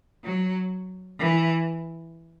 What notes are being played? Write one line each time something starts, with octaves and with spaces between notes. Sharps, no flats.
F#3
E3